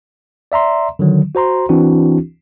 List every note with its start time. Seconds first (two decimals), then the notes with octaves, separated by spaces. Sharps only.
0.52 D5 E5 A#5 C6
0.99 D3 D#3 F#3
1.35 F#4 C5 A#5 C6
1.69 E3 C4 D4 E4 F#4